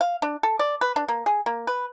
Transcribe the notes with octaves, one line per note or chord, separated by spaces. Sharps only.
F5
D4
A4
D5
B4
D4
A#3
G#4
A#3
B4